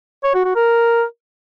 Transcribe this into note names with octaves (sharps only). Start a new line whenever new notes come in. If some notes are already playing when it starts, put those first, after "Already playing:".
C#5
F#4
F#4
A#4